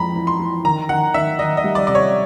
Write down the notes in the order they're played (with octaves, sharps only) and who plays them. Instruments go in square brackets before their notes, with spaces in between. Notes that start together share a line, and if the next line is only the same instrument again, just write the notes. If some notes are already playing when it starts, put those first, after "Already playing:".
Already playing: [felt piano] F2 E3 G#3 [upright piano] A#5 B5
[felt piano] E3
[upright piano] C6
[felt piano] E3
[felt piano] D#3 [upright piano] A#5
[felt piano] D#3 [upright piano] F#5
[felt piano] D#3 [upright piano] E5
[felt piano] D#3 [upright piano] D#5
[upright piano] D#5
[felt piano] G3
[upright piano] D5
[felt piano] C3 [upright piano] D5
[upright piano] C#5